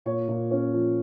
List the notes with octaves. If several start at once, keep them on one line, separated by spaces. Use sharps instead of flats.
A#2 C#5
A#2
C#4
F3